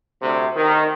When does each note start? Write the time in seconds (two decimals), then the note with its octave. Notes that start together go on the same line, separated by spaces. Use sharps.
0.22 D2 C3
0.55 D#3